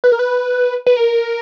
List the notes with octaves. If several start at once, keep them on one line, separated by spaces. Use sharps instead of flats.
B4
A#4
B4
B4
A#4